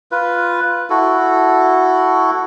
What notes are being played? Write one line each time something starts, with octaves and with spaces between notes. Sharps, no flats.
F4 B4
E4 F#4 A4